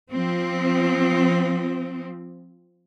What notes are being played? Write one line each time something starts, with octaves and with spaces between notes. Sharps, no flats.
F3 C4